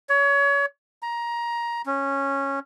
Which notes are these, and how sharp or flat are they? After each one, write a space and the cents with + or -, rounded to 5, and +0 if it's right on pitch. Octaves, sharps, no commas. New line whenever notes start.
C#5 +30
A#5 +15
C#4 -10